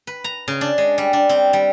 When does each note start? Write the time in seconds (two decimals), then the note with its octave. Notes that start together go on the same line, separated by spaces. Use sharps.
0.07 B4
0.24 A#5
0.48 C#3
0.61 D4
0.78 G#3
0.98 G3
1.13 D4
1.29 C4
1.53 G3